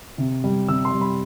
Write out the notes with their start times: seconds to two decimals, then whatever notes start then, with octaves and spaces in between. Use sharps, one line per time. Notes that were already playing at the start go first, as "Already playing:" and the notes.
0.18 C3
0.44 G3
0.68 C3 E6
0.85 C6
0.93 G3
1.01 B5